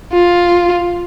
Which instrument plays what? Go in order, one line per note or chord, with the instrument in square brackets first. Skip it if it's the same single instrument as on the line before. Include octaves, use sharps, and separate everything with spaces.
[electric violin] F4